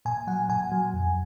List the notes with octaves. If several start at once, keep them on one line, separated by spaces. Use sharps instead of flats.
A#2 G#5
F#3 F#5
A#2 G#5
F#3
F2